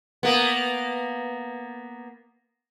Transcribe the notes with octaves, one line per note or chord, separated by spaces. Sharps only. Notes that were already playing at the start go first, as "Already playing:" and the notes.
A#3 B3